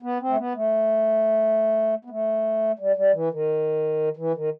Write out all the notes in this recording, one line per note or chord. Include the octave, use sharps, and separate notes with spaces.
B3
C4
A3
B3
A3
B3
A3
G3
G3
E3
D#3
E3
D#3